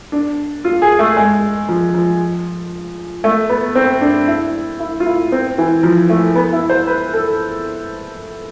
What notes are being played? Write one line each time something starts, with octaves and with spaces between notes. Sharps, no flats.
D4
F4
G#4
A3
G#3
F3
F3
A3
B3
C4
D4
E4
E4
F4
E4
C4
E3
F3
A3
B3
E4
C5
B4
A4